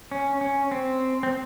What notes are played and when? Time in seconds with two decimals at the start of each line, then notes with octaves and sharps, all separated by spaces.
0.11 C#4
0.41 C#4
0.72 C4
1.23 C4